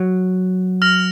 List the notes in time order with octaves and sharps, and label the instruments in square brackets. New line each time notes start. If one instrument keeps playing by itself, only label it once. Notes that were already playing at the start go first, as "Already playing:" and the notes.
Already playing: [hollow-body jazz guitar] F#3
[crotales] F6 A#6 F7